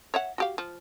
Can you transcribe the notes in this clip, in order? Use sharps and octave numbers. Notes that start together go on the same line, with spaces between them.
C#5 E5 F#5
F#4 G4 F5
F3